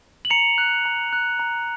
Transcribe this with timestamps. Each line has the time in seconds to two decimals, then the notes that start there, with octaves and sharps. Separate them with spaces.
0.25 F#7
0.30 A#5 C#7 F7
0.58 F#6
0.85 A#5
1.13 F#6
1.40 A#5